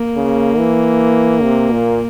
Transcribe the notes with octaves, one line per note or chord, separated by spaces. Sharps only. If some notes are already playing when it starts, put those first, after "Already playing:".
Already playing: A#3
C#3
E3
C3
A#2